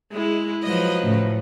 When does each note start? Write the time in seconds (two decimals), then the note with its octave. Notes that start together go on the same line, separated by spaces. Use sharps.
0.13 G#3 E4
0.64 F3 F#3 B4 D#5
1.04 A2 C#3